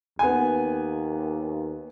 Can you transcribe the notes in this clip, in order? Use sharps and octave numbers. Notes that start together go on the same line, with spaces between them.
D#2 B3 G#5